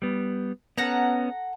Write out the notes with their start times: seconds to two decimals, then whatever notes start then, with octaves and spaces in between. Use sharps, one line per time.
0.02 G3 B3
0.78 B3 C#4 A4 F#5 A#5